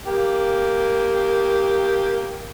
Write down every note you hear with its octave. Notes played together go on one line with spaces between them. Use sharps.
A#3 G4